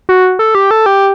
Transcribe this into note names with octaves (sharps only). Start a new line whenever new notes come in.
F#4
A4
G4
A4
G4